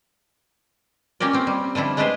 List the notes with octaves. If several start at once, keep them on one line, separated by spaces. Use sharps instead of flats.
A#3 C#4 G4 A#4 D5
C4 C#4
G3
D3 F3 G3 E4
G#3 A3 D4 G4 B4 C5